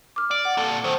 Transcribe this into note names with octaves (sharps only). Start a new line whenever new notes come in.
D6 F6
D5
F#5
A#2 A4
D#3 A3 C5